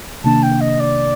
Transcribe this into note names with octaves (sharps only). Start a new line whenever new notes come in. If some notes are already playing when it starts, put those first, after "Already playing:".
C3 D#3 A#3 D4 A5
G5
D#5
D5